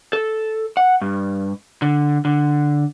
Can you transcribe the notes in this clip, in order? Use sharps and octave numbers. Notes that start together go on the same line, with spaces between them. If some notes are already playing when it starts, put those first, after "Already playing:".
A4
F#5
G2
D3
D3